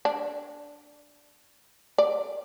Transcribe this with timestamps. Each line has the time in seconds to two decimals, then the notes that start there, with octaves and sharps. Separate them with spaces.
0.05 D4
1.98 D5